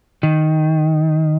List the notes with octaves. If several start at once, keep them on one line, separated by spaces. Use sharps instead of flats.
D#3